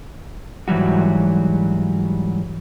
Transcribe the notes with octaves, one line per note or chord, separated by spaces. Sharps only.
G#2 E3 F#3 G3 F#4